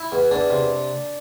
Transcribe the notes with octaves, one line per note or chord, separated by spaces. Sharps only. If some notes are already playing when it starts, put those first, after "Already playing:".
Already playing: E4
E2
E2 D4
C3